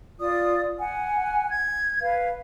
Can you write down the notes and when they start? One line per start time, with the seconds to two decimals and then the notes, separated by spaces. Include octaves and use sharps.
0.20 F4 D5 D#6
0.78 F#5 G#5
1.49 G#6
2.01 B4 F5